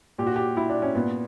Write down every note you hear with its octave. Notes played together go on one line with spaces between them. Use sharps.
A#2 G4
F#4
G4
E4
D4
C#4
A#2 B3